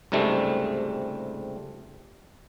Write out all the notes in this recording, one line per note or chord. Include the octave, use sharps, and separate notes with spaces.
C#2 G#2 C3 G3 A3